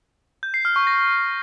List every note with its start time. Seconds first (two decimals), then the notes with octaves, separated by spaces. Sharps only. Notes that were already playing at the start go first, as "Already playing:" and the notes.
0.43 G6
0.54 C7
0.65 F6
0.76 C#6
0.87 A#6